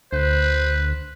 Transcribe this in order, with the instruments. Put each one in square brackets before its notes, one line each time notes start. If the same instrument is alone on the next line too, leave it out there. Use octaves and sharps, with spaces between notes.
[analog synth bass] D2 [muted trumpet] B4 [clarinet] C5